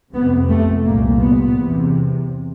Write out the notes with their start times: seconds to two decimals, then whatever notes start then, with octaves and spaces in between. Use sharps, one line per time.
0.13 F2 C3 B3
0.49 A3
0.85 C2 A#2 A#3
1.20 B3
1.56 E2 C3